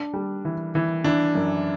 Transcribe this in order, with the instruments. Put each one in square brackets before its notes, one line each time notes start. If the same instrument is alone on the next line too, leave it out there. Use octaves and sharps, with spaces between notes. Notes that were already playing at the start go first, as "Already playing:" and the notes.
Already playing: [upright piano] D4
G3
E3
E3
[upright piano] E3 [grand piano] D4
[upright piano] F#2